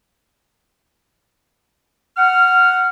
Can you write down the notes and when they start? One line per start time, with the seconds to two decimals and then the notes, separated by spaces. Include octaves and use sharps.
2.17 F#5 F6